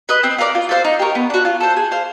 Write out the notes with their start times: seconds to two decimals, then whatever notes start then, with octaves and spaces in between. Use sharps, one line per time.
0.09 B4 D#5
0.24 C4
0.38 F4 A#4 D5
0.55 F4
0.69 A4 C5 F5
0.85 D#4
0.99 G4 A#4 C#5
1.15 B3
1.30 D4 F#4
1.45 F4
1.60 A4 C5
1.76 G#4
1.92 C5 F5